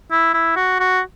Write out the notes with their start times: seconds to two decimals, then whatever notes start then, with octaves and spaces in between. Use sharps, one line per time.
0.11 E4
0.34 E4
0.56 F#4
0.79 F#4